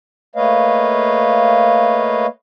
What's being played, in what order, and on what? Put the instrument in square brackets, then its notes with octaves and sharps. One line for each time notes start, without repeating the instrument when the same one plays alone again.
[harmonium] A3 A#3 B4 C#5 D#5 F5